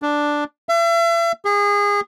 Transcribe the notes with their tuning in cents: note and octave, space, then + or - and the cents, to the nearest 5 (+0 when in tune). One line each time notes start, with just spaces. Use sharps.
D4 +0
E5 +40
G#4 -30